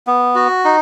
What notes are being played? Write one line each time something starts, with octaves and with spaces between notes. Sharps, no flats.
B3
F#4
D#4